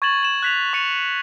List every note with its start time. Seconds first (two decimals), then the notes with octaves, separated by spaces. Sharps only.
0.02 C#6 G#6 A6 E7 F#7
0.23 E7 F#7
0.43 F#6 B6 F7
0.73 C#6 C#7 D#7 F7